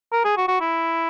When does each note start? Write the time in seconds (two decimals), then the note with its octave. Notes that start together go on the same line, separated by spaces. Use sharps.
0.13 A#4
0.24 G#4
0.37 F#4
0.48 F#4
0.61 E4